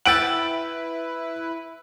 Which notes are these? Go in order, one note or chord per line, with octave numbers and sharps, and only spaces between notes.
E4 B4 F#5 G5 E6 A6 D7 F#7